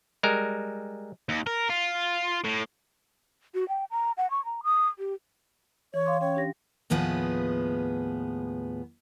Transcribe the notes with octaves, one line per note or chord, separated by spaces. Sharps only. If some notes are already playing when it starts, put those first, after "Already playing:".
G3 G#3 A#4
D#2
A#4
F4
A2
F#4
G5
A#5
F#5
C#6
A#5
D#6
G4
E3 C#5
F5 C6 D6
C#4 C#5 G5
D4 G4 A#6
D#2 A2 F3 B3 G#4 B4